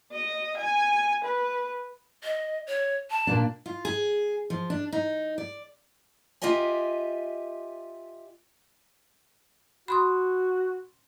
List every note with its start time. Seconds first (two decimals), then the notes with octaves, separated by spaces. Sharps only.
0.12 D#5
0.57 G#5
1.24 B4
2.23 D#5
2.67 C#5
3.10 A5
3.27 A#2 A#3 D4
3.66 F4
3.85 G#4
4.50 F3
4.70 D4
4.93 D#4
5.38 D5
6.42 F4 G4 D#5 E5 G#5
9.88 F#4 B5 C6 D#6